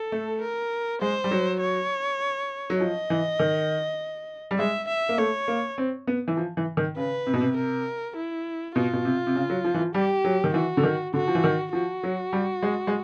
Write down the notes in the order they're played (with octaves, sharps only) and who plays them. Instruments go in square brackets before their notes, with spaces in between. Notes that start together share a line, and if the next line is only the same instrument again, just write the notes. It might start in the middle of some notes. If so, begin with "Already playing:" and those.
Already playing: [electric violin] A4
[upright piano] A3
[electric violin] A#4
[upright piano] G#3 [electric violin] C5
[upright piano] G3
F#3
[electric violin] C#5
[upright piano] F#3
[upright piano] F3 [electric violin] D#5
[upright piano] E3
D#3
G3
[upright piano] G#3 [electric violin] E5
[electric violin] E5
[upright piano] A#3
[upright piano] A3 [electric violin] C#5
[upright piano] A#3
C4
B3
E3
F3
E3
D#3
[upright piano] C#3 [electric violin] B4
[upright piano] C3
B2
C3
[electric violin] A#4
E4
[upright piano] B2 [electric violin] F4
[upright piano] B2
C3
C3
C#3
F#3
F3
E3
F3
[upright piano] G3 [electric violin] G4
[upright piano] F#3
D#3
[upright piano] E3 [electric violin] F#4
[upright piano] D3
D#3
[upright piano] D3 [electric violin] F#4
[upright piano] F3
E3
D#3
[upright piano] F3 [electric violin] F#4
[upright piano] F#3
G3
G#3
G#3